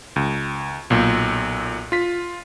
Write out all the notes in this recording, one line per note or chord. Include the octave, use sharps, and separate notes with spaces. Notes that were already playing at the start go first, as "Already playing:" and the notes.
C#2
B1 A#2
F4 B6